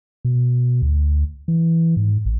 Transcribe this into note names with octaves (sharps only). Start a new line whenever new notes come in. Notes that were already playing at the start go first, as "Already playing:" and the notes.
B2
D2
E3
G#2
A1